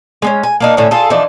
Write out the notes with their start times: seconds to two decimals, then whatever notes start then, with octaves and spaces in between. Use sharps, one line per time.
0.22 G#3 B3 C#4
0.43 G#5
0.60 A#3 D4 D#4
0.77 A2 D3 C#4 E4
0.91 F4 G#4 A4
1.10 E3 F3 D4 D#4